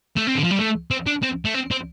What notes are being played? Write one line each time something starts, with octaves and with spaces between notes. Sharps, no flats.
A3
C4
D3
F3
G3
A3
C4
D4
C4
A3
C4
C4